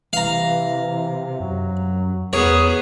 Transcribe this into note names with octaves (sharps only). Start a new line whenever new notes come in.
C3 E3 F5 A#5
F#2 F#3
E2 B3 G#4 A#4 C#5